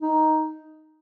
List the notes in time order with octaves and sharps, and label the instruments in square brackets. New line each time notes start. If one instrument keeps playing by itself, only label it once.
[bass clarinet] D#4